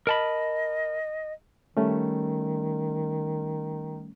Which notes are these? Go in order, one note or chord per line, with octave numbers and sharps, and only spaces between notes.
A#4 D#5 A5 B5
D#3 G3 A3 C#4